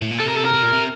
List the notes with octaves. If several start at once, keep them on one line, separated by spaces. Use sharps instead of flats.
A2
A#2
C3 A4
A#4
A4
A#4
C3
A#2
C3